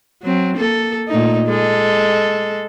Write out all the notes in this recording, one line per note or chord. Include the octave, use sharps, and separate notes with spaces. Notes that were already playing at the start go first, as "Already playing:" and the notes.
F#3 C4
A#3 A4
A#2 A3 D#4
G#3 A4